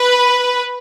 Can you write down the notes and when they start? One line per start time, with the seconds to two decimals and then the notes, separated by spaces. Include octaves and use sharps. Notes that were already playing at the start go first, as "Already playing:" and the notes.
Already playing: B4